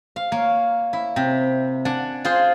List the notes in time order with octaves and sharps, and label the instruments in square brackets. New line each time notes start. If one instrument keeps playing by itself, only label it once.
[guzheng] F5
A#3 C#5
E4
C3
D4 F#5 G#5
F4 G#4 C5